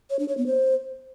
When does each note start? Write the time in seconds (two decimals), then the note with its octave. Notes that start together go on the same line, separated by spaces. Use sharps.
0.10 C#5
0.19 D4
0.28 C#5
0.37 B3
0.46 C5